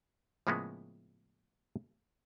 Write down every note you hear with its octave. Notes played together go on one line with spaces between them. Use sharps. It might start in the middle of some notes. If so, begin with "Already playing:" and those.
A2 C#3 F3 G#3 A#3 B3